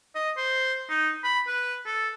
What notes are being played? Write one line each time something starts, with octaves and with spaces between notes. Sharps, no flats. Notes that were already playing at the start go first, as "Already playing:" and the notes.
D#5
C5
D#4
B5
B4
A4